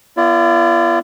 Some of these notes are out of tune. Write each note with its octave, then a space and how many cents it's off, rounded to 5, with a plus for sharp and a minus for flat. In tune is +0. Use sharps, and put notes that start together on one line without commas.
B3 -10 F4 -45 D5 -5